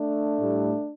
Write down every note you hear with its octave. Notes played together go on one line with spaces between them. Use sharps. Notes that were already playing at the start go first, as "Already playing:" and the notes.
Already playing: A3 D4
A2 G3